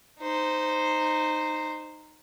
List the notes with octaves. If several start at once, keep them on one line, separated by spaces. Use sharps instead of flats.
D#4 C5